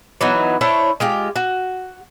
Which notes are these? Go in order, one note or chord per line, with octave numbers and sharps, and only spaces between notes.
E3 F#3 B3 D#4
D4 E4 C5 C#5
G#3 F4 G4
F#4